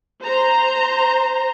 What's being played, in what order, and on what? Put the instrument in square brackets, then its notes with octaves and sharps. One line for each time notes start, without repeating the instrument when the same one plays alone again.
[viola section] C5 A#5